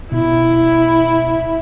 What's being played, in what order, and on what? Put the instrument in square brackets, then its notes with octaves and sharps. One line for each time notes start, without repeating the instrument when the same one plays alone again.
[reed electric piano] B2 [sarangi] E4